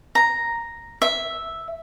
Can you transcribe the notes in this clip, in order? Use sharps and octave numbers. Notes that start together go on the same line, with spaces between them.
A#5
E5